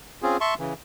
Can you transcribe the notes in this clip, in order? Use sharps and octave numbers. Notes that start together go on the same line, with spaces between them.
C4 C#4 F4 G#4
E5 A5 C6 C#6
C#3 E3